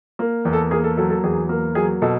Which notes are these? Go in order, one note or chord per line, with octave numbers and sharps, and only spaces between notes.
A#3
E2
A4
A#3 G#4
A4
F#3 A4
A4
E2 G#4
A#3
F#3 G#4
B2 A4